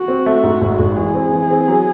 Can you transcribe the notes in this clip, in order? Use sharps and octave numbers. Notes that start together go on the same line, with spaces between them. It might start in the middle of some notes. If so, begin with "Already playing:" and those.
Already playing: F#4
C4
A3
G#2 F#4
G#1
G#1
E3 G#4
C4
E3
C4
F#3